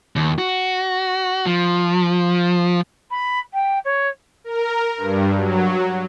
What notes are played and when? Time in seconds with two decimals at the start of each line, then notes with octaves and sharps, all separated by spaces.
0.16 D#2
0.39 F#4
1.46 F3
3.10 B5
3.53 G5
3.84 C#5
4.44 A#4
4.97 G2
5.37 F#3